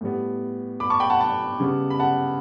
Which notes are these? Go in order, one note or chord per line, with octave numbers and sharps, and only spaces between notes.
A2 G3 B3
B5 D6
A5 C#6
G5 B5
F#5 A5
F#5 A5
C#3 G3 B3
B5
F#5 A5